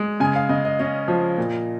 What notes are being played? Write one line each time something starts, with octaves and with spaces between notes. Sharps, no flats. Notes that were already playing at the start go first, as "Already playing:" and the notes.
Already playing: G#3
C#3 G#5
F5
C#3 D#5
D#5
C#4 D#5
F3
A#2